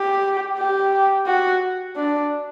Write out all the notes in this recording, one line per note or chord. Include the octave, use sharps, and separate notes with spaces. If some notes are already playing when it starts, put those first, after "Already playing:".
Already playing: G4
G4
F#4
D4